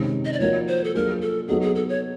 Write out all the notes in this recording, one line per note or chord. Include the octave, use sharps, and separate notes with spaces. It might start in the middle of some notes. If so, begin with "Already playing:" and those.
Already playing: C3 D#3 G#3 C#4
D#5
D5
F3 A#3 D#4 F#4 A#4 C#5
C5
A4
F#3 A#3 D4 F4 G#4 A#4
A4
F#3 B3 D#4 F#4 G#4 A4
G#4
A4
C#5